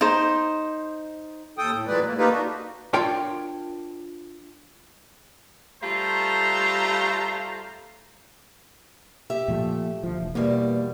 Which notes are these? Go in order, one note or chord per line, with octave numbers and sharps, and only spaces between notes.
D#4 C5
D#2 A4 G5 D#6
A2
A#2 E3 F#3 G#3 B4 D5
A3 A#3
A3 A#3 D#4 F4 G4 B4
D4 F#4
D4 F4 A#4 C#5 G5 C6
G3 A3 F4 C5 A#5
G4 E5
A#2 F3 A3
D2 F3
E1
E2 B2 G3 A#3